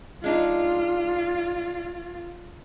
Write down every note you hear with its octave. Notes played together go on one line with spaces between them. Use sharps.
G#3 D4 D#4 F4